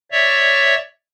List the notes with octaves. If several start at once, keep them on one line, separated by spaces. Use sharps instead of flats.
C#5 D5 E5